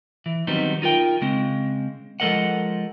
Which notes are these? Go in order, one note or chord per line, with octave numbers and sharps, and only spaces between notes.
E3
D#3 F#3 G3 B3 C4 D#4
D#4 F4 A#4 G5
C#3 G#3 C4
F3 G#3 A4 A#4 D#5 F#5